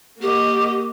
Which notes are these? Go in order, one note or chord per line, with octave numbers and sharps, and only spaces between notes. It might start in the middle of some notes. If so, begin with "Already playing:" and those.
A#3 F#4 G4 D#5